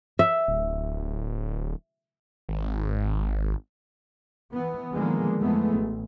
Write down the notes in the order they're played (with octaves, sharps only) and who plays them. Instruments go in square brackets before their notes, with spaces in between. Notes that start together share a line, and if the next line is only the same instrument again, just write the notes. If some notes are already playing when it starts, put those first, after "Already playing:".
[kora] E5
[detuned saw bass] D1
G#1
[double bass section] E3 B3
D3 D#3 F3 G#3 A#3 B3
F2 E3 G#3 A3 B3
A1